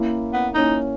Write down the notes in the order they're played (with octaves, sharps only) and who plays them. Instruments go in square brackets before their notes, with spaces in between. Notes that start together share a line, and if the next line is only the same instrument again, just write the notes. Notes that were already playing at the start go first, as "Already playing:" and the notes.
Already playing: [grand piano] A#3 C#4 E4
[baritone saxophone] B3
[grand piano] A#3 C#4 E4 [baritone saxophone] D#4